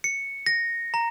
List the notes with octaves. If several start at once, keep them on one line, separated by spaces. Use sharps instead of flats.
C#7
A#6
A#5